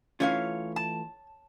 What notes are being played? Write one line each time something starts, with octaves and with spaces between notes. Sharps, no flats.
E3 A3 C#4 F4 C#5 F5
A5